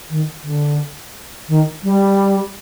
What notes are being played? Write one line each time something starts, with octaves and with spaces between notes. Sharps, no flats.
D#3
D3
D#3
G3